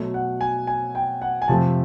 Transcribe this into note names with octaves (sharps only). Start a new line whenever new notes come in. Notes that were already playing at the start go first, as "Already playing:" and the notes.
Already playing: B2 F#3 A3
F#5
G#5
G#5
G5
F#5
G#5
F2 C3 F3 A3 A5